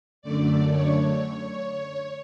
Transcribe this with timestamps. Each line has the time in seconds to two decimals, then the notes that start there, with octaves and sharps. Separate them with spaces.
0.22 F#2 D3 A3 D5
0.70 C#5